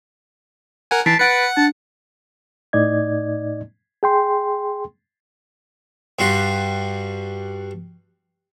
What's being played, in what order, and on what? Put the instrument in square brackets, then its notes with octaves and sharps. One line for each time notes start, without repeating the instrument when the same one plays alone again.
[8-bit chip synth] A#4 F#5 G#5
[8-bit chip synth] E3 [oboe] A5 [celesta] B6 C7 D7
[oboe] B4 [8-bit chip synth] F#5 C#7 [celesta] A6 D7
[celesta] D4 [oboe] A5
[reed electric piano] A2 D#4 D5 D#5 G#6
G#4 G5 C6
[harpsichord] G2 G3 F#4 C6